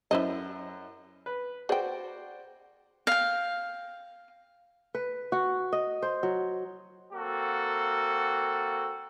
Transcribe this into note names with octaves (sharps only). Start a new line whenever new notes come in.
F#2 E4 C5 D#5
B4
F#4 G#4 C5 D5 G5
F5 G5
B4
F#4
D#5
C5
F#3
A#3 C4 F#4 A4